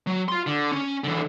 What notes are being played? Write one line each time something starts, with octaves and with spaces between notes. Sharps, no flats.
F#3
F4 C6
D3
C#4
D3 E3